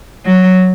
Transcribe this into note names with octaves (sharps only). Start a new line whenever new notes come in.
F#3